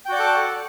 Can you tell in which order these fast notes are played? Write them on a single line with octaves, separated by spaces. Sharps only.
G5 F#4 D5 F#5 A4